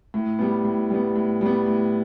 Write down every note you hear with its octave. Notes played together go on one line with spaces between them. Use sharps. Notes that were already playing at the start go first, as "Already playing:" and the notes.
A2
G3 B3
A2
G3 B3
A2
G3 B3
A2